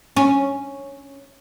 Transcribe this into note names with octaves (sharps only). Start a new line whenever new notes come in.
C#4